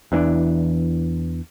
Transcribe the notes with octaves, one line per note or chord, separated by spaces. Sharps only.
E2 E3 C4 D4